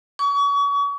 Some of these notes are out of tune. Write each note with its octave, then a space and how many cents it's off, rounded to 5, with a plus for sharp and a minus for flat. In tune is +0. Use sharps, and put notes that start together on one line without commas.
C#6 +35